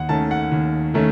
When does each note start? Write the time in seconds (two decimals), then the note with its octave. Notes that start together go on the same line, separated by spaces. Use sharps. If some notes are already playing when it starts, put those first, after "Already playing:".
Already playing: D#2 F#5
0.09 D#3 A3 C#4 A5
0.31 F#5
0.51 D#2
0.94 D#3 A3 C#4